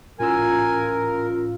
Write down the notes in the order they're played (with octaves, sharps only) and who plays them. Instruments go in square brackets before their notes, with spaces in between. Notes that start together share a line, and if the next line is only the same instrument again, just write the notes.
[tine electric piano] A2 C#4 E6 [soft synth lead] F4 [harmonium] A#4 [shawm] G#5